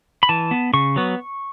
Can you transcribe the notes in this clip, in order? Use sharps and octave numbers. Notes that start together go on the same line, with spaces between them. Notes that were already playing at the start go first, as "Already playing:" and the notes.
B5
E3 A5
B3
C#3 C#6
F#3 B3